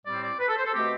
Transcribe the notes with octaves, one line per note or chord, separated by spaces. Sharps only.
A2 G3 C4 D5
D5
B4
A4
C5
A4
B2 A3 C4 G4